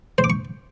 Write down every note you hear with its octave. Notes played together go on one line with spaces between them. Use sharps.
C5
D6
C#6